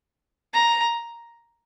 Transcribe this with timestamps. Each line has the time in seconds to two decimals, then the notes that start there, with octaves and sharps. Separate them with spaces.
0.54 A#5